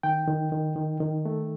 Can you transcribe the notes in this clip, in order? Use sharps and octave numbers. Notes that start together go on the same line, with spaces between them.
D#3 G5
D#3
D#3
D#3
D#3
A3